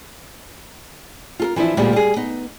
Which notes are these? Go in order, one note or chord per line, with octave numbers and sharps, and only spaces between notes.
F4 A4 A#4
E3 F3 D4 E4
D2 A#2 G3 G#3 B3
G3 G#4
B3 D#4